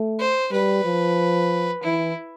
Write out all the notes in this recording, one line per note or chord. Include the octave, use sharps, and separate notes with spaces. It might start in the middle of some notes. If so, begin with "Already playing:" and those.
Already playing: A3
C5
G3 B4
F3
E3 E4